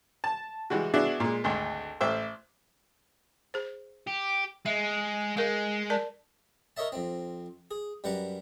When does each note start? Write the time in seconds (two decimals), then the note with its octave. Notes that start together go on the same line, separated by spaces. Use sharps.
0.24 A5
0.70 E3 G3 G#3 F#4
0.94 B3 D4 E4 F#4 G#4
1.20 A#2 G#3
1.44 G#1 D2 C6
2.01 A1 C5 E5
3.54 G#4 C5
4.07 G4
4.66 G#3 E5
5.37 G#3 A#4 F5
5.90 A#4 D5 A5
6.77 A#4 C#5 D#5 E5 A5
6.92 F2 C4
7.71 G#4
8.04 F#2 G3 B4 F#5 A#5